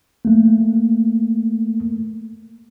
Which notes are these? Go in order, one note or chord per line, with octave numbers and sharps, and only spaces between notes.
A3 A#3